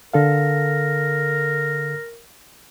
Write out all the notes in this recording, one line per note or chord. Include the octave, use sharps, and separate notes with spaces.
D3 A4 A#4 F5